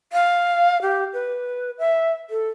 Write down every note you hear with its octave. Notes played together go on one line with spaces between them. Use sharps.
F5
G4
B4
E5
A4